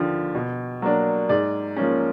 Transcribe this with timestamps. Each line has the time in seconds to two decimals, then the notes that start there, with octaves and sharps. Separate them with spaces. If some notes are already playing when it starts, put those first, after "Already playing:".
Already playing: D#2 D3 F3
0.35 B2
0.82 F#3 A#3 D4
1.29 G#2 D5
1.77 F3 A#3 C#4